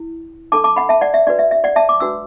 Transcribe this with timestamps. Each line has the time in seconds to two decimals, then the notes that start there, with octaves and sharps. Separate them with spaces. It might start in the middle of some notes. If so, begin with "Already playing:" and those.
Already playing: E4
0.52 D4 A4 A5 D6
0.64 A5 D6
0.76 F#5 B5
0.89 E5 A5
1.01 D5 F#5
1.14 E5
1.27 D4 F#4 B4 D5
1.39 E5
1.51 E5
1.64 D5 F#5
1.76 E5 A5
1.89 D6
2.00 D4 F#4 B4 E6